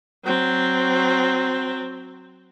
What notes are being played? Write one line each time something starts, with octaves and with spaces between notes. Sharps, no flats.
F#3 C4